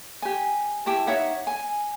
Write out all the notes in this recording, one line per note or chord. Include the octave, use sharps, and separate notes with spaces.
G4 G#5
E4 G4 G5 A5
D#4 C#5 E5 F#5
G#5